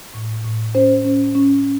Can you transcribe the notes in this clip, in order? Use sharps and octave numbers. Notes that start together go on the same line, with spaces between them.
A2
A2
C#4 C5
C#4
C#4